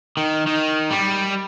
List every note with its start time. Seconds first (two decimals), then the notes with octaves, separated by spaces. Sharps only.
0.17 D#3
0.47 D#3
0.91 G3